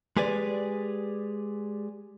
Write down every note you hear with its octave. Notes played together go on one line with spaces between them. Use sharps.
G#3 G4 G#4 B4 D5